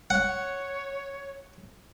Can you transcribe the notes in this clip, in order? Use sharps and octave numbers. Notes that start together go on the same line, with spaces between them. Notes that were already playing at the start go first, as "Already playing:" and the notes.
C#5 F#5